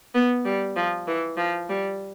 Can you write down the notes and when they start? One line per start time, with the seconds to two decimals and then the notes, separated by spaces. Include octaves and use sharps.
0.15 B3
0.45 G3
0.76 F3
1.07 E3
1.37 F3
1.69 G3